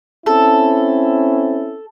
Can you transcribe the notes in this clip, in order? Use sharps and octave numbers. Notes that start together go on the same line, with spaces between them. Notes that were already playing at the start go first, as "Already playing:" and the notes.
C4 C#4 E4 A4